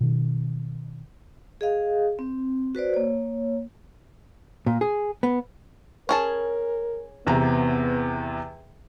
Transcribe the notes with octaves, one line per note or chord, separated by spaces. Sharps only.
B2 D#3
G#4 D#5 F5
C4
F#4 B4 C5 D5
A#3 C#5
A#2
G#4
B3
C#4 G#4 A#4 A5
E2 C3 B3 A#5